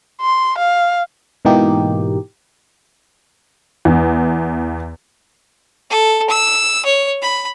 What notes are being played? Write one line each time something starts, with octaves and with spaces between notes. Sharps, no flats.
C6
F5
G#2 B2 E3 A#3 D#4 G4
E2
A4
E6
C#5
B5